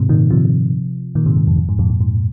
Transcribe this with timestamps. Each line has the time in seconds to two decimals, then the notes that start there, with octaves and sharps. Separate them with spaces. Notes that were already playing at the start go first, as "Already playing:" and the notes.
Already playing: G#2 C3
0.09 A#2 D#3
0.30 C3 F3
1.15 A#2 D#3
1.26 G#2 C3
1.37 G#2
1.47 F2
1.58 F2
1.69 G#2
1.79 F2 A#2
1.90 F2
2.01 G#2